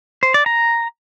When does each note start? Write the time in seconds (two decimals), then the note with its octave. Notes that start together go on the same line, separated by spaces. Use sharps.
0.23 C5
0.34 D5
0.46 A#5